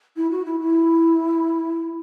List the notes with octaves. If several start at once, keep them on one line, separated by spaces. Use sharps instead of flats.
E4
F#4
E4
E4